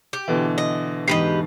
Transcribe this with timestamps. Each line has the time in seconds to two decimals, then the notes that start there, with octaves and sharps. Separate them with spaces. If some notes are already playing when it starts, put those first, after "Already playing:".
0.13 G4
0.28 B2 D3 E3
0.58 D#5
1.08 E2 G#2 G4 B4 D#5 C7